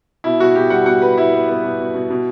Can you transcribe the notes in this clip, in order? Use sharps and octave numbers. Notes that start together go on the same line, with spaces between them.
B2 E4
B2 F#4
B2 G4
G3 F#5
B2 F#5
G3 B4
G3 E4
B3
B3
B2
B2
B2
B2